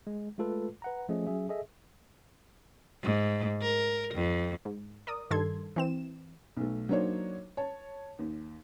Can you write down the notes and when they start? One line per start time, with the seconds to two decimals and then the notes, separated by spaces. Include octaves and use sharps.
0.07 G#3
0.38 G#3 A3 F4 A4 B4
0.82 B4 F#5 A#5
1.09 F3 A3 C#4 G#4 D#5
1.27 F#3 C#4 G#4 E5
1.49 G#4 A4 D#5 E5
3.03 G#2
3.62 A#4
4.14 F2
4.65 G#2
5.07 A#4 D5 D#6
5.31 G2 D#3 A4 C6 G#6
5.76 E3 C4 E7
6.57 B1 A3
6.89 F#3 A#3 D4 D#4 C5 C#5
7.57 C#5 A5
8.19 D#2